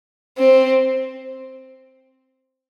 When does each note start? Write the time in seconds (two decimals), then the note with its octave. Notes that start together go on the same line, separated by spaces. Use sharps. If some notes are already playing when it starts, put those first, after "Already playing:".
0.38 C4